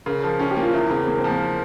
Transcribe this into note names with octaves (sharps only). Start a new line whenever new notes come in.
C#3 A#4
F3 A#4
C#4 G#4
G4
A#3
F4
E2 E4
C#3 C4
E2 A#3
C4
F3
A#3